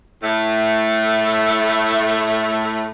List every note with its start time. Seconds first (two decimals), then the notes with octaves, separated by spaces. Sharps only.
0.23 A2 A3